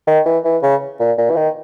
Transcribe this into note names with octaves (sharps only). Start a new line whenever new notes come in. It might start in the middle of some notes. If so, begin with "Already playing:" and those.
D#3
E3
E3
C#3
A#2
A#2
E3
D#3